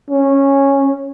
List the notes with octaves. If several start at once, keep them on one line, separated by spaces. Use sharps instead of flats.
C#4